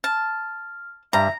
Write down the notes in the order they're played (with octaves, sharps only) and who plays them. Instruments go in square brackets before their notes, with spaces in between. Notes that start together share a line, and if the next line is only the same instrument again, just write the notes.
[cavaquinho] A5 [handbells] F6
[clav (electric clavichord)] G2 G3 [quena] E5 [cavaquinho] A#5